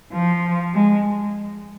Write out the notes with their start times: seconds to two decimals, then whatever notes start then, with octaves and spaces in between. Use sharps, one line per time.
0.13 F3
0.74 G#3